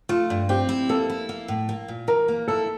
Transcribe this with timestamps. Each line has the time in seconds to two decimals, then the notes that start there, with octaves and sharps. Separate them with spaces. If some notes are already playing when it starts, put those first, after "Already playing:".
0.09 A3 F4
0.30 G2
0.49 C4 G4
0.69 E4
0.89 A#3 A4
1.10 E4
1.29 A#3
1.48 A2
1.69 A#3
1.88 A#2
2.08 E3 A#4
2.28 A#3
2.48 E4 A4